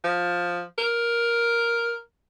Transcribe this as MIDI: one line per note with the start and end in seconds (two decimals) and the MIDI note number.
0.04 0.62 53
0.78 1.98 70